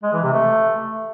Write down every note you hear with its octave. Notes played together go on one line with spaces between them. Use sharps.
G#3
E3
C3
A3